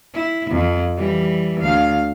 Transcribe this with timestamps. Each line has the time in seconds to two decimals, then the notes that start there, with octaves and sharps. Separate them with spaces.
0.14 E4
0.51 F2
0.97 E3 G3
1.61 D2 F5